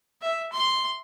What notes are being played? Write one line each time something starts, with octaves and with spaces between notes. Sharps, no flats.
E5
C6